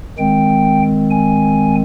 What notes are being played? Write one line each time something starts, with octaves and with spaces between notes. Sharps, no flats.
D#3 G#3 C4 G5
G#5